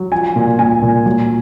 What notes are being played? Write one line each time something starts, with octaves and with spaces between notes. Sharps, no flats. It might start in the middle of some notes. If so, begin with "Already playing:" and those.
Already playing: F#3
F3 G#5
A#2
A#2 G#5
A#2
F#3